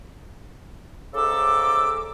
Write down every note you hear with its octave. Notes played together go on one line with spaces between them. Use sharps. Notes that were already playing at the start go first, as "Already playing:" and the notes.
G#2 C#3 A4 D6 E6